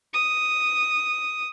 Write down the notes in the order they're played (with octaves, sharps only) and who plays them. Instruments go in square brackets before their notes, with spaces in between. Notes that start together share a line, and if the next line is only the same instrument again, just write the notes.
[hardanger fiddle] D#6